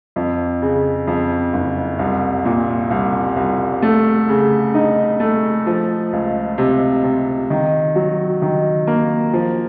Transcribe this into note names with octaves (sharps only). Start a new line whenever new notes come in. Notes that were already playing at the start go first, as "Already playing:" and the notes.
F2
C#3
F2
F#1
C2
A#2
C2
C2
A3
C#3
D#4
A3
F3
C#2
C3
C3
D#3
F#3
D#3
A#3
F3